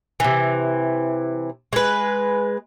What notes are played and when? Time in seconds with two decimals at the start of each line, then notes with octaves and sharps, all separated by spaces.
0.20 C3 E3
1.73 G#3 B4